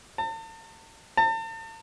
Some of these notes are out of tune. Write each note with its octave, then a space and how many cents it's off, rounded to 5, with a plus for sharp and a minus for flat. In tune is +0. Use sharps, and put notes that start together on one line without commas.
A5 +40
A5 +40